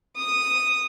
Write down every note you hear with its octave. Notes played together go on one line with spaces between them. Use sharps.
D#6